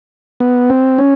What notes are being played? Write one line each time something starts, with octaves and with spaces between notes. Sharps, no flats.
B3
C4
C#4